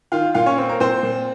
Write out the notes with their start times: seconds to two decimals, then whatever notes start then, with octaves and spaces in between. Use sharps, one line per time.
0.12 D#3 F4 F5
0.34 A#2 F4 F5
0.46 C#4 C#5
0.58 C4
0.69 A#3 A#4
0.80 A#2 C4 C5
1.03 A#2